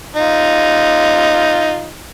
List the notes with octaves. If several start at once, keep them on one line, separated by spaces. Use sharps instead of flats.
D#4 F4